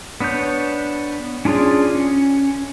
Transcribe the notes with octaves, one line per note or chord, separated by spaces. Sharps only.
B3 D4 B4 C#5 G6
C#4 D4 F4 G#4 D5
C#4